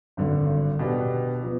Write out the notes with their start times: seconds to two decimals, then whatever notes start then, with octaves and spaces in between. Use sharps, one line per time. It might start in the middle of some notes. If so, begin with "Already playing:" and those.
0.17 G#1 G2 D3
0.79 B2 B3 D4 G4
1.43 F3 B3